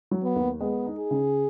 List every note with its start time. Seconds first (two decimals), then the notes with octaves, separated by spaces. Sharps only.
0.11 F#3
0.23 B3
0.36 D#2
0.60 G#3 B3
0.86 D#4
0.98 G#4
1.11 C#3